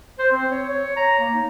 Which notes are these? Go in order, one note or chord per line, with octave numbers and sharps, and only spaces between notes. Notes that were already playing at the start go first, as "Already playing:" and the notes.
C5
C4
C#5
C#5
A#5
A#3
D#4